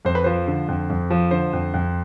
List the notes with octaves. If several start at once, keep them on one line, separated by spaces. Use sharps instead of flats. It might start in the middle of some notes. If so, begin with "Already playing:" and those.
F2 C5
B4
F3 C5
D3
F2
F2
F3
D3 C5
F2
F2